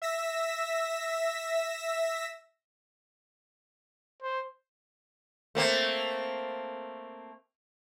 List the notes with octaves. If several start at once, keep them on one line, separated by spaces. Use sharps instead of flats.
E5 E6 A#6 B6
C5
A3 A#3 C4